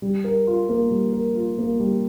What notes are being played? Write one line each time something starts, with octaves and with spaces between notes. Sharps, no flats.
G3
A#4
F4
A#3
G3
A#4
F4
A#3
G3